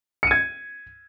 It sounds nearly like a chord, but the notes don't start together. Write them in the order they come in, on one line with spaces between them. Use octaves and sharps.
C#7 D#7 G#6